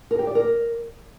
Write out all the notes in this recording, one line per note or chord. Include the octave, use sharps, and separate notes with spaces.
A#4
G4
D5
A#4